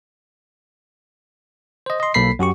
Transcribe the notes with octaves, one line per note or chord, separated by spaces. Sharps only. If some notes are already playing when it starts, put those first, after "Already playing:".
C5 D#5
D#5 C6
B1 A#3 A4 B5 B6 C7
F#2 F#4 G4 C#6